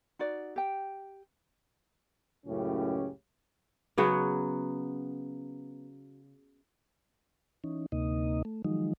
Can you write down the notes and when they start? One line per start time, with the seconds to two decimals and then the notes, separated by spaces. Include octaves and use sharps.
0.19 D#4 F#4 D5
0.56 G4 G5
2.46 C#2 F#2 A2 C#3 C#4 G4
3.98 C#3 F#3 B3 F#5
7.64 E3 C#4 D#4
7.92 D2 C3 A#3 D#4 D#5
8.45 A3
8.65 D#3 F3 F#3 G#3 D#4